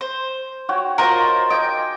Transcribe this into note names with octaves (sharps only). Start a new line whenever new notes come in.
C5
F#4 C#5 G5
F4 A#4 C5 D#5
D#5 G5 G#5 D6